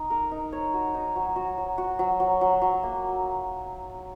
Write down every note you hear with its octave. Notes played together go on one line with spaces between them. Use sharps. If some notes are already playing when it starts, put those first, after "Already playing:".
Already playing: D#4
A#4
D#4
C#5
F#4
D#4
F#3
F#4
F#3
F#4
F#3
F#3
F#3
F#3
A#3